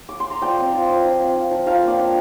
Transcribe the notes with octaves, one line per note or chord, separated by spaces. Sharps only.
D6
C6
A#5
F3 D5 G5
C4
F4
F3
F3
C4
F4
F3
F3 F5 A#5
A#3 D5 G5
D4